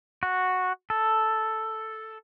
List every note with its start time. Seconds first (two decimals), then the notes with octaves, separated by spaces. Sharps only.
0.23 F#4
0.90 A4